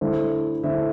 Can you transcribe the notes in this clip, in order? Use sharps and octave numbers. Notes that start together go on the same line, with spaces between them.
D3 A3 E4 C5 E5
D3 A3 E4 C5 E5